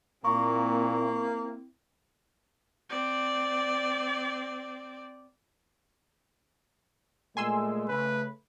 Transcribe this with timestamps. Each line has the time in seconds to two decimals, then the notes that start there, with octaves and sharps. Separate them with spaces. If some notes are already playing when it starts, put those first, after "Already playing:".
0.25 A#2 A#3 C4 E4 C#6
2.90 C4 D5
7.37 A#2 G#3 A3 G#5 C6 E6
7.88 C#3 A3 B4